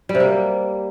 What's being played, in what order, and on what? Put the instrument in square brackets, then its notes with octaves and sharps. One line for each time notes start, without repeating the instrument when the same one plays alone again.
[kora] G3
C3
A#3